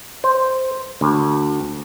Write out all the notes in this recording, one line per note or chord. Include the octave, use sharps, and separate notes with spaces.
C5
D2